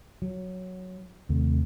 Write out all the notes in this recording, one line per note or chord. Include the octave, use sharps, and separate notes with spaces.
F#3
D#2 C3 A3